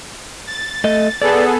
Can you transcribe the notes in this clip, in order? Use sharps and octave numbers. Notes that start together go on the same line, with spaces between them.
A6
A3 D#5
B3 G#4 A4 D5